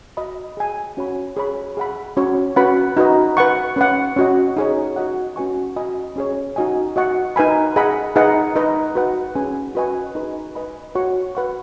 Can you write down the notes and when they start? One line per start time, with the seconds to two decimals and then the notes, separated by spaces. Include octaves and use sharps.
0.17 F#4 D#5 B5
0.57 G#4 D#5 G#5
0.97 C#4 F#4 C#5 F#5 B5
1.37 G#4 C#5 B5
1.77 G#4 D#5 F#5 B5
2.17 C#4 F#4 C#5
2.56 C#4 F#4 B4 F#5 B5
2.97 D#4 F#4 B4 D#5
3.37 B4 F#5 C#6
3.76 C#4 B4 F#5
4.16 C#4 F#4 D#5
4.56 D#4 G#4 C#5
4.96 F#4 D#5 F#5
5.36 C#4 F#4 B4 G#5 C#6
5.76 F#4 D#5 G#5 B5
6.16 C#4 G#4 C#5
6.56 D#4 F#4 D#5 G#5
6.96 F#4 D#5 F#5 C#6
7.36 D#4 B4 G#5 B5
7.76 G#4 D#5 F#5 B5
8.16 D#4 G#4 B4 D#5 F#5
8.56 D#4 B4 D#5
8.95 F#4 B4 F#5
9.35 C#4 G#4 B4 G#5
9.75 F#4 B4 D#5 G#5 C#6
10.15 D#4 G#4 B4
10.55 B4 D#5 G#5 B5
10.95 F#4 C#5 F#5 C#6
11.35 B4 F#5 C#6